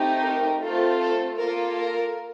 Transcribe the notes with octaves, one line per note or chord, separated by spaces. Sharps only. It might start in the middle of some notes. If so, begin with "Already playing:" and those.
Already playing: A3 C4 D#4 G4
A#4
A3 C4 F4 A4
A4
A#3 F4 A4 A#4
A#4